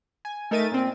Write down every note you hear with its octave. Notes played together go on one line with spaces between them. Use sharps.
G#5
A3 D#4 A#4 E5 A6 D#7
A#2 C4